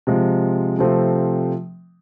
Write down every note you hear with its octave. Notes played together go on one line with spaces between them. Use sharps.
C3 F3 G#3
C3 F3 A3 C4